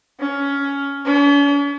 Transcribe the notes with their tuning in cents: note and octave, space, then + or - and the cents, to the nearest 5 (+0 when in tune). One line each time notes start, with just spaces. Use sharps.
C#4 +15
C#4 +45